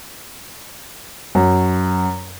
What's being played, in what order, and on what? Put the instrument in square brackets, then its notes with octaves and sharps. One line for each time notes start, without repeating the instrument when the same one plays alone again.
[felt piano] F#2